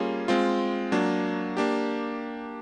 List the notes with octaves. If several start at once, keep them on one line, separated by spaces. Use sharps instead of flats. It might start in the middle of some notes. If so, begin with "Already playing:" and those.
Already playing: G3 A#3 C#4 F4 G#4
G#3 C4 F4
F#3 A#3 D4
A#3 D4 G4